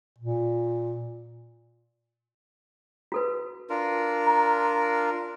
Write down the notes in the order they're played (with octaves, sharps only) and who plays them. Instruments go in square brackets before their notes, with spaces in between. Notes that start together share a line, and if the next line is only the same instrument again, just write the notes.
[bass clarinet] A#2
[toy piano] F#4 A4 B4
[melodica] D4 F4 A#4
[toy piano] A#5